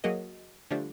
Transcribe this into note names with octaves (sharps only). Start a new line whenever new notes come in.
F#3 A#3 F#4 G#4 A#4 D#5
D3 F3 G3 A3 D4